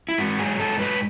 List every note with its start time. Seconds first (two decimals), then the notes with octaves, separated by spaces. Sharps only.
0.09 E4
0.18 G#2 F#4
0.39 F#3 G#4
0.59 G#2 A4
0.78 F#3 B4